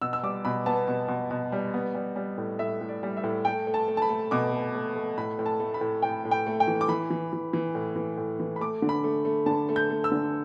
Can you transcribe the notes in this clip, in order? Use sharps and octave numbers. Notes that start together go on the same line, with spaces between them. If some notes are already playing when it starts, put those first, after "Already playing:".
B2 E6
E6
G3 D6
B2 B5
B3 A5
B2
B2
B2
G3
B3
G3
G3
A2
A2 E5
A2
D5
G3
E5
A2
A3 G5
A3
A5
A3
A5
B5
A3
B2 D6
A3
A3
A3
A2 B5
A2
A5
A3
B5
A2
A2 G5
A2
G5
A3
G5
E3
D6
E3 B5
E3
E3
E3
A2
E3
A2
E3
B5
A3 D6
D3
B5
A3
A3
D3 A5
A3
G6
A3
E6
D3